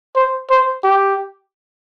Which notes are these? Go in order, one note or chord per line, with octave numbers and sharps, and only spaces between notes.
C5
C5
G4